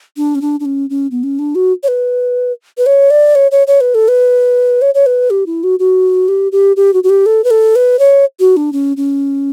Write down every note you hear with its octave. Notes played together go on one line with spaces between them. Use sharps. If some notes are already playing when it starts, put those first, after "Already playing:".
D4
C#4
D4
D4
C#4
C#4
B3
C#4
D4
F#4
C#5
B4
B4
C#5
D5
C#5
C#5
C#5
B4
A4
B4
C#5
C#5
B4
G4
E4
F#4
F#4
G4
G4
G4
F#4
F#4
G4
A4
B4
A4
B4
C#5
F#4
D4
C#4
C#4